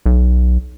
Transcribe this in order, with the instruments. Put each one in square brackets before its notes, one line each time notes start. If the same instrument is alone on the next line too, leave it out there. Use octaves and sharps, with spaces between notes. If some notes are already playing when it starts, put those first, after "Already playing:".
[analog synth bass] B1